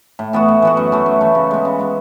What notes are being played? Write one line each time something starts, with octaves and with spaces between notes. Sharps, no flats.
A2
E3 B3 F#4
A2
E3 B3 F#4
F#2
E3 A3
F#2
E3 A3
C#3
G#3 B3
C#3
G#3 B3